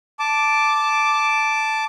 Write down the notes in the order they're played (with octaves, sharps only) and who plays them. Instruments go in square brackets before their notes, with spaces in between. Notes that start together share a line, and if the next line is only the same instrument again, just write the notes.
[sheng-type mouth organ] A5 D6